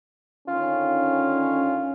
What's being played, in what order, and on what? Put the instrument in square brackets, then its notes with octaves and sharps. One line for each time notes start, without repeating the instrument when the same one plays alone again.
[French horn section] D3 D#3 C#4 [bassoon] F4